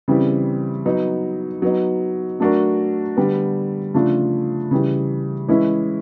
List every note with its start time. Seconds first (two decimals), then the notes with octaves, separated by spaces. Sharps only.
0.08 C#3 E3 G3 C4
0.86 F#3 B3 D#4
1.62 F#3 B3 D#4
2.40 F#3 A3 D4 F#4 A#4
3.17 D3 G3 B3
3.94 C#3 F3 A3 D4 F4
4.71 C#3 E3 G3
5.48 E3 G#3 C#4 E4